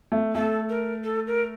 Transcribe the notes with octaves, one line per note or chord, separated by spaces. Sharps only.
A3
A3 A4
A#4
A4
A#4